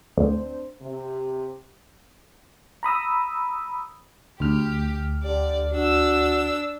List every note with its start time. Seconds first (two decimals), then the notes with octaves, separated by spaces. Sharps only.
0.18 D2 C4 D4 C5
0.81 C3
2.83 A#5 B5 D#6 E6
4.40 D2 G4 F6
5.23 D3 G4 D5
5.72 D4 F#4 E6